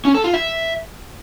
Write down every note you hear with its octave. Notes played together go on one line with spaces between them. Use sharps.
C#4
A4
F4
E5